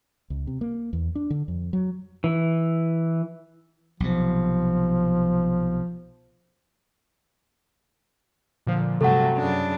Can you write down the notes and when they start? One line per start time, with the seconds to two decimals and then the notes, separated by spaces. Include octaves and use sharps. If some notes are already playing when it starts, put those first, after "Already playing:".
0.30 C#2
0.47 C3
0.61 A#3
0.93 E2
1.15 D4
1.30 D3
1.48 F2
1.73 F#3
2.24 E3
4.00 B1 C3 F3
8.67 A#2 D3 F3
9.01 G2 C3 F#3 A3 A4 F#5
9.38 F#2 C#3 D4